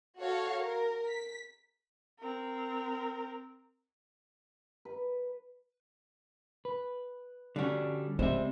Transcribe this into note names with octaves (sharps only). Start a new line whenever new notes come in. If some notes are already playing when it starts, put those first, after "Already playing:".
F#4 A4 C#5 F5
A#4
B6
C4 A#4
B4
B4
D3 G3 C#4 D4 F#4
C#2 G3 G#3 C4 C5 E5